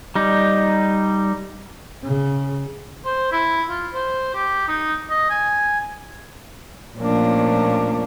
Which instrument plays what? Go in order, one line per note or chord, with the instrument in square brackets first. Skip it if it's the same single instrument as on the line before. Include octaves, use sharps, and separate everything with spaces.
[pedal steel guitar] G3 D#4
[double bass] C#3
[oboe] C5
E4
F4
C5
G4
D#4
D#5
G#5
[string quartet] A#2 F3 A3 A#3 C#4 D4